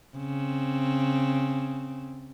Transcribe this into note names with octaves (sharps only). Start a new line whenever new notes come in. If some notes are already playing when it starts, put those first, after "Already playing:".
C#3 C4